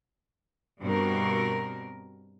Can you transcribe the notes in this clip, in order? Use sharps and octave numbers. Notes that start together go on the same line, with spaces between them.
G2 B2 C4 A#4